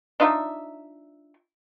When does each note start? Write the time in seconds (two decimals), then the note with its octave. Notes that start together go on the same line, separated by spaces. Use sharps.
0.20 D4 D#4 F4 E5